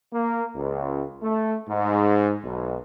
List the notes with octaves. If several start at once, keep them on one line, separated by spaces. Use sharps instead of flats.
A#3
C#2
A3
G#2
B1